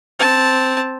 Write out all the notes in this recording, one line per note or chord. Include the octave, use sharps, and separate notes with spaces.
C4 A5